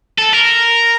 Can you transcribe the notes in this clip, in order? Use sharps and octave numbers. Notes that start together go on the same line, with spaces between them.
A4
A#4